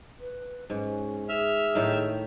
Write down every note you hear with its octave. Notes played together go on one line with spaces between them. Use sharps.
B4
G#2 C#4
G#4 E5 F6
A2 D#3